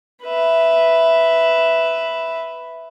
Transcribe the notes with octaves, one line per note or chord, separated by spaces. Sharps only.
B4 E5